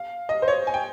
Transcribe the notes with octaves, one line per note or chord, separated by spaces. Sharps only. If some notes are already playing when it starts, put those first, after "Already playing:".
Already playing: F5
D#5
C5
C#5
G#5
G5